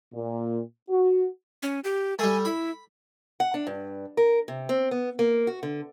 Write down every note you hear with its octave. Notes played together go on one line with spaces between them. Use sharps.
A#2
F#4
C#4
G4
G3 A3 G#5
E4 B5
F#5
D4
G2
A#4
C3
C4
B3
A#3
F#4
D3